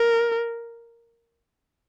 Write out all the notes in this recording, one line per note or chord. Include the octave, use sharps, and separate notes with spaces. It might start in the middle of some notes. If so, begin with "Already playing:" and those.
Already playing: A#4